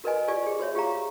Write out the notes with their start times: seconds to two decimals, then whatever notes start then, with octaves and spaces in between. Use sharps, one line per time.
0.04 F#4 A#4 B4 D#5 G#5
0.28 F4 G4 D5 G#5
0.43 G#4 C5
0.59 F#4 C5 C#5 E5
0.75 F4 G4 G#4 F5 A#5